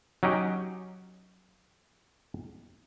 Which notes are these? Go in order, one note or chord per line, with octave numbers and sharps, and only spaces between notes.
F#3 C#4 D#4 G4